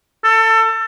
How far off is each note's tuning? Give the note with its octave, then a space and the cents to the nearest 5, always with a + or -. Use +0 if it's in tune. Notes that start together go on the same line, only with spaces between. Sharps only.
A4 +25